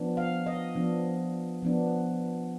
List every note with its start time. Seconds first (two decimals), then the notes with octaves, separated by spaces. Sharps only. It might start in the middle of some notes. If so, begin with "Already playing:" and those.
Already playing: F3 B3 D4
0.17 F5
0.46 D#5
0.75 F3 B3 D4
1.62 F3 B3 D4